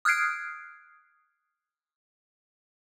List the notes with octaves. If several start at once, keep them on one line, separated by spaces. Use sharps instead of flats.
D#6 F6 F#6 G#6 C7 D7